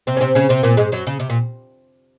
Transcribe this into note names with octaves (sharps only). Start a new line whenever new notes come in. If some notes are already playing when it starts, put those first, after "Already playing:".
C3 C4
C#4
C3 C4
C#3 C#4
C3 C4
A#2 A#3
G#2 G#3
F#2 F#3
C#3
C3
A#2